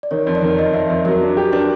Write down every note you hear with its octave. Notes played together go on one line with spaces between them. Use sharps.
D5
D#3 C#5
F2
D5
D#3
F2 D#5
F2 E5
F2 A#4
F#3 A#4
D4
G4
D4 B4